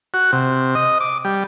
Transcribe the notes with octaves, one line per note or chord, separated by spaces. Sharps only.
F#4
C3
D#5
D6
G3